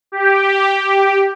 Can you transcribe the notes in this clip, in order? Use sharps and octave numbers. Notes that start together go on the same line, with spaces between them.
G4